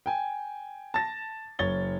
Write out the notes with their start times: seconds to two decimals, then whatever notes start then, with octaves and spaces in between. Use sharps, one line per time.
0.06 G5 G#5
0.94 A5 A6 A#6
1.59 F#1 C#5 A6 G7